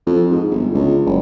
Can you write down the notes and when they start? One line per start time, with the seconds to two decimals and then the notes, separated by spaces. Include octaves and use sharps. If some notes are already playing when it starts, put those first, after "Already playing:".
0.06 F2
0.31 G#2
0.50 G1
0.74 C#2
1.05 F#1